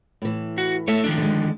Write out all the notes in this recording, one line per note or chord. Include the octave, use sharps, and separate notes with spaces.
A2 E3
F#4
A3 C#5 E5
D#3 F3 D4
D3 G#3